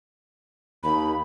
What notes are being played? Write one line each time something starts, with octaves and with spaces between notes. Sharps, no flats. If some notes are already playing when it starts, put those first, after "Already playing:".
D#2 B5